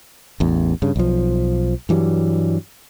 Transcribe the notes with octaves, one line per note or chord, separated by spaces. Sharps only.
A1 E2
G2 C#3
B1 F3
G2 E3 F#3 G3